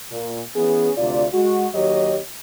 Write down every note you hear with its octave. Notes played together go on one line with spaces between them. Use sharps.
A#2
E3 B3 C#4 G#4
D2 C3 F4 D5
G#3 F#4
D#2 F#3 G4 C#5 D#5